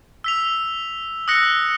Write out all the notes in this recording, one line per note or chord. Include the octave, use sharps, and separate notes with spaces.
E6 B6 F7
D#6 E6 F#6 A#6 C#7